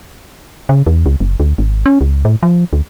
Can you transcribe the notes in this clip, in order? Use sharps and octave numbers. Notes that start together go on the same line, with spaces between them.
C#3
E2
C#2
F#1
D2
G#1
C#4
C#2
A2
F3
D2